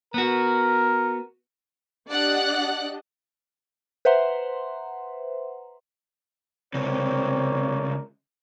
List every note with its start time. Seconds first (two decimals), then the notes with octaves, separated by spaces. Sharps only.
0.14 B3 F#4 A#4
2.08 D4 G4 D5 D#5 F#5 F#6
4.05 B4 C5 E5 F#5 A#5 C6
6.74 C#2 C3 C4 A#4 C#5 D5